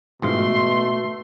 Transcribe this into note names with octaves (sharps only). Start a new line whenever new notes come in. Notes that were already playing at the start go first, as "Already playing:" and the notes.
A1 G#2 B2 A3 F4 C6